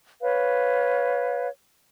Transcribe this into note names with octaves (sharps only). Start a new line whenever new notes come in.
B4 C#5 F5